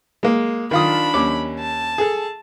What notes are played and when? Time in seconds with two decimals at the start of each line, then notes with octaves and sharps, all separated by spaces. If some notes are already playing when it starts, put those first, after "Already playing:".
0.23 G#3 A#3
0.71 D#3 D4 F4 B5 D#6
1.14 D#2 C#4 D6
1.59 A5
1.98 G#4 A4